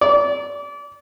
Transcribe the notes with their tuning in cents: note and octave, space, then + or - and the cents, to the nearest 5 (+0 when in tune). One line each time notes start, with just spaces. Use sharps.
D5 -30